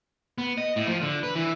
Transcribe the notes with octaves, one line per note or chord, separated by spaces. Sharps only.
B3
D#5
A2
F3
D3
B4
E3